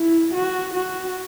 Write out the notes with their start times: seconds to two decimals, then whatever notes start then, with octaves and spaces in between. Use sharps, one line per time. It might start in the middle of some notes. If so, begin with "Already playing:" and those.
Already playing: E4
0.34 F#4
0.74 F#4